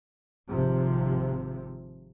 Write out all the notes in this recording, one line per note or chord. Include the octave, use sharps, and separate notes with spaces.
G#1 C3 F3